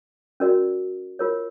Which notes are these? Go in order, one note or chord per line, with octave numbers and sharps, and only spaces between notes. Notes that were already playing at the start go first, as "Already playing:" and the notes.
C#4 F#4 A#4 D5
F4 A#4 C#5